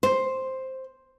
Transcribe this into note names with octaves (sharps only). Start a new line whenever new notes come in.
C5